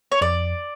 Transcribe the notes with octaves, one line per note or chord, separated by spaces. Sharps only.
C#5
F2 D5